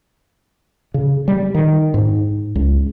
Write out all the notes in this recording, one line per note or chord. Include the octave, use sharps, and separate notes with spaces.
C#3
G3
D#3
G#2
C#2